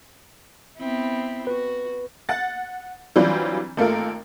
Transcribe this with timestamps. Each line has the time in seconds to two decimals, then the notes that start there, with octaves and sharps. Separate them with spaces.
0.78 B3 C4 E4
1.47 F#4 B4
2.29 F#5 A6
3.16 E3 F#3 G3 C4 D4 F4
3.77 G#1 A3 A#3 F4 A#4